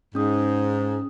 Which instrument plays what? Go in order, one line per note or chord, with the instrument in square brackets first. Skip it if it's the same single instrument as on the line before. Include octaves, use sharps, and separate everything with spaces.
[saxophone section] G#2 [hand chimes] C#4 D#6